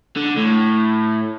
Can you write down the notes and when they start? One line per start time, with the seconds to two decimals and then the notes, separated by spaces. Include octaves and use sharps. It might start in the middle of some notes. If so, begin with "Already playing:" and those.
0.16 D3
0.38 A2